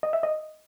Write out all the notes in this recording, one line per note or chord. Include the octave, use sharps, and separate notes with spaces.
D#5
E5
D#5